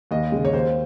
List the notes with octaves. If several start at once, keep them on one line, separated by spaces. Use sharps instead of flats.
D#2 D#5
C#3 G#3
C#5
D#2 C5